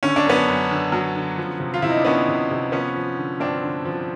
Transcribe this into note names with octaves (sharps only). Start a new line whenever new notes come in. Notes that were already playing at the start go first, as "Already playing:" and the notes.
D3 C#4
D4
F#2 B3 C#4
F#2
D3
F#3
D3
F3
C3
F4
C3 E4
D#4
D4
D2 B3 C#4
C3
C3
F3 B3 C#4
F3
D3
G2 C4 D4
D3
F3